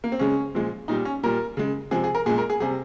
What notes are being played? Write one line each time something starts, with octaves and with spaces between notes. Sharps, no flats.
A#3
C4
C#3 G#3 C#4
A#2 F3 G#3
A#2 G3 D#4
C#4
A#2 G3 A#4
C#3 G#3
C3 F3 G#3 G#4
G#4
A#4
A#2 G#3 G#4
A#4
G#4
C3 G3 G#4